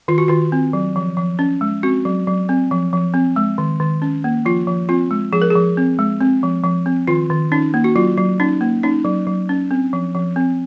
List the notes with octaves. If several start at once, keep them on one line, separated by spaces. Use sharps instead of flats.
D#3 F4
F#4
D#3 F4
C4
F#3
F3
F3
C#4
G#3
C4 F#4
F#3
F#3
C4
F3
F3
C4
G#3
D#3
D#3
C#4
A#3
F3 F4
F3
C4 F4
G#3
F3 G#4
A#4
G#4
F3
C4
G#3
C4
F3
F3
C4
D#3 F4
D#3
C#4 D#4
A#3
F#4
F#3 F4
F#3
C#4 D#4
A#3
C#4 D#4
F#3
F#3
C#4
C4
F3
F3
C4